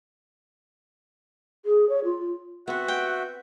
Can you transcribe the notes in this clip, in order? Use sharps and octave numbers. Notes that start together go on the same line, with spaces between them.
G#4
C#5
F4
B3 C4 F#4 E5 F#5
G5